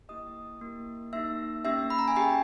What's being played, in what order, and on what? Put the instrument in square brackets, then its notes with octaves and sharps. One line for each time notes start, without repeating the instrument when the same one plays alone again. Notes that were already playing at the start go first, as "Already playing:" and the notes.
[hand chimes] A#3 E4 G4 D#5 D#6
A#3 E4 G4
A#3 D#4 G4 E5 E6
A#3 C#4 G4 E5 E6
B5
A#5
G#5
C#4 G4 G#4 G5